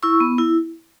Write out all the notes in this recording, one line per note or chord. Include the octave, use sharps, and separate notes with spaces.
E4 C#6 E6
B3
E4